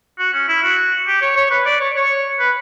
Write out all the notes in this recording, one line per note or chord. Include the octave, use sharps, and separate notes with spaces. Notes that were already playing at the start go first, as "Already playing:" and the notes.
F#4
C#4
E4
F#4
G4
C#5
C#5
B4
D5
C#5
C#5
B4